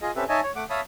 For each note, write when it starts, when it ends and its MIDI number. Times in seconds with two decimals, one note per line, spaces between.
0.02 0.11 65
0.02 0.11 68
0.02 0.11 75
0.16 0.24 60
0.16 0.24 61
0.16 0.24 67
0.16 0.24 69
0.16 0.24 71
0.16 0.24 76
0.29 0.41 63
0.29 0.41 73
0.29 0.41 75
0.29 0.41 76
0.29 0.41 80
0.29 0.41 81
0.43 0.51 73
0.56 0.64 57
0.56 0.64 78
0.56 0.64 86
0.70 0.81 73
0.70 0.81 76
0.70 0.81 77
0.70 0.81 81
0.70 0.81 83
0.70 0.81 87